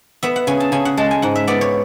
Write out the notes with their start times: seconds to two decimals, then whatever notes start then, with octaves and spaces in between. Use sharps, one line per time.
0.23 B3 E5
0.36 F#5
0.47 C#3 G#5
0.60 A5
0.72 C#3 G#5
0.85 F#5
0.97 G#3 A5
1.11 G#5
1.22 G#2 F#5
1.36 E5
1.48 B3 D5
1.61 C#5